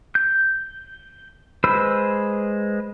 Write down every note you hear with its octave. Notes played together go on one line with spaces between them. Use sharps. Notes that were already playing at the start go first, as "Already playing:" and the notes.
G6
G#3 B4 C5 B5 E6